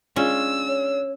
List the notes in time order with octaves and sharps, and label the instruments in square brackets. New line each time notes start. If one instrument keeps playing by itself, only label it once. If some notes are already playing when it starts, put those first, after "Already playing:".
[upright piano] G#3 D4 F4 [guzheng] C#4 [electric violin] E6
[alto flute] C#5